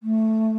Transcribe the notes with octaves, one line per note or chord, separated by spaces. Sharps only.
A3